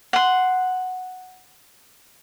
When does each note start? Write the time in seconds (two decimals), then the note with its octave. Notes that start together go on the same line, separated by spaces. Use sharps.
0.13 F#5 C6